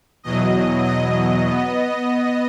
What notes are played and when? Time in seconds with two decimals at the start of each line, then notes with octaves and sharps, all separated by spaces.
0.23 E2 B2 F#3 D#5
0.85 D#5
1.46 B3